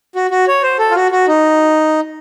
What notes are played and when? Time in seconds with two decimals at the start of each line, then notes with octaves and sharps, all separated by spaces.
0.15 F#4
0.31 F#4
0.48 C#5
0.63 C5
0.79 A4
0.91 F4
0.95 F#4
1.11 F#4
1.28 D#4